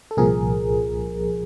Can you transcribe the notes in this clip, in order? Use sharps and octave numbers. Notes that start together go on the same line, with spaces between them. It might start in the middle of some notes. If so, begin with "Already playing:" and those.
A4
C2 A#2 F3 G#4 A#4